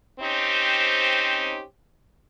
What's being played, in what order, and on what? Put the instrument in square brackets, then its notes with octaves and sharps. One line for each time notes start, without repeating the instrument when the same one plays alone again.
[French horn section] C4 C#4 D#4 G4 C5